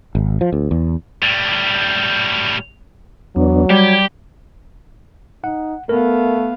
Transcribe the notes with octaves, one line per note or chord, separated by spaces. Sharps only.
G#1
F3
D2
E2
A2 G3
E2 F#3 B3 D4
G3 G4 G#6
D#4 F#5
A3 B3 A#4 F5